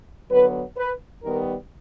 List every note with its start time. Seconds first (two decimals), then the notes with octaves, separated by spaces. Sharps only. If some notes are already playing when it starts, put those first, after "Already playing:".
0.30 D3 F#3 B3 B4
0.77 B4
1.22 D#3 G3 B3 A#4